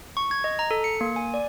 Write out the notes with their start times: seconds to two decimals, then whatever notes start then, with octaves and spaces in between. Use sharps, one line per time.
0.17 C#6
0.31 G#6
0.44 D#5
0.59 A#5
0.71 A4
0.84 C#7
1.01 A#3
1.16 G#5
1.34 D5